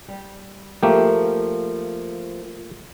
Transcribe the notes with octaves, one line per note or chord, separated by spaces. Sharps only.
G3
F3 A3 A#3 G4